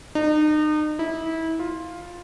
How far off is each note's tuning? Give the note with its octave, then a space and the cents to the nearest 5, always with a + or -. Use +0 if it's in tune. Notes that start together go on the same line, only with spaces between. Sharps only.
D#4 -35
E4 -25
F4 +5